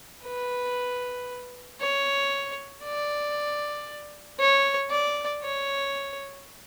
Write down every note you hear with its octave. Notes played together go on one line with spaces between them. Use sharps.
B4
C#5
D5
C#5
D5
C#5